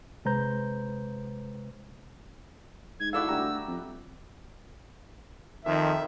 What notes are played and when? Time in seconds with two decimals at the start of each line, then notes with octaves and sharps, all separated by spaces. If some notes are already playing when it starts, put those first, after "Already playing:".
0.25 C3 G#3 B4 C5 A#5 G6
3.00 G#2 G#6
3.13 E4 F#4 A4 D5 E5 F5 E6
3.29 D2 G3 G4 A#5
3.67 F2
5.65 F2 D#3 E5